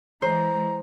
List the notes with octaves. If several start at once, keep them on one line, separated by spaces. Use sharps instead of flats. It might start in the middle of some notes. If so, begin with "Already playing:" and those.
E3 G#3 C5 A#5